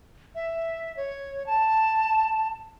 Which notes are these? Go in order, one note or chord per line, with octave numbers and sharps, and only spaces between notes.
E5
C#5
A5